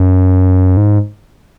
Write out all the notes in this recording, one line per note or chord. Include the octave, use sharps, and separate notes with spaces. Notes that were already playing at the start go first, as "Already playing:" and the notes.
Already playing: F#2
G#2